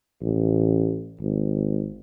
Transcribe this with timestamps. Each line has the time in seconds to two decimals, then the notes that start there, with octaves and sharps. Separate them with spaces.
0.22 A1
1.21 G#1